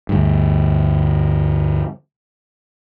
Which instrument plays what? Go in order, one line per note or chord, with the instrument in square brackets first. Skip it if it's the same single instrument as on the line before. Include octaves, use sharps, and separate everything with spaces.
[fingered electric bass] D2 G2